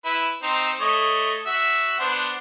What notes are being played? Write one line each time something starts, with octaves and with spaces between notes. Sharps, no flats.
E4 B4
C4 D#4 C5
A3 C#5 D#5
F#4 E5
B3 D4 C5